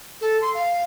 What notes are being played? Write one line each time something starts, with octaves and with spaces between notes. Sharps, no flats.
A4
C6
F5